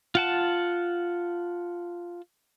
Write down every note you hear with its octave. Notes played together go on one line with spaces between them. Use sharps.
F4 F#5 A5